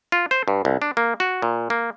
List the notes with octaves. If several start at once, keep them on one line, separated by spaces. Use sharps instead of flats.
F4
C5
G2
C2
D4
A#3
F#4
A#2
A#3